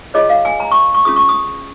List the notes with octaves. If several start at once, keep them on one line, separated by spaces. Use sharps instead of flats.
F4 G#4 C#5 D#5
F5
G#5
A#5
C#6
C#6
C#4 F4 G#4 D#6
C#6
D#6